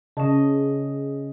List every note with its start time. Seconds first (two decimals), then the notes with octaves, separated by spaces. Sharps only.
0.17 C#3 C#4 D#5 A5